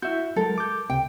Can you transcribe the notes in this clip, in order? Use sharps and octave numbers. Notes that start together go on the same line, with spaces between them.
E4 F#4 E5 G6
F#3 G#3 A4 A#4
D6 G6
C#2 C3 G5